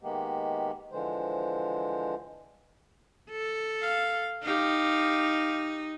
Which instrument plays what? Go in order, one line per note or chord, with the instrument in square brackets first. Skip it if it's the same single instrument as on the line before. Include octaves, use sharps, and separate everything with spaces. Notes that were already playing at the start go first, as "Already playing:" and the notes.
[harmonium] D#3 G#3 A#3 B3 G4
D3 E3 F3 G#3 C5
[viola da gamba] A4
[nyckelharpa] F5
[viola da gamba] D#4 [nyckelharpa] G4 F5